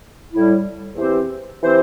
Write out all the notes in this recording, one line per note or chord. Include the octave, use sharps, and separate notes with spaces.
A2 G3 E4
E2 E3 C4 G4 C5
E3 C4 G4 C5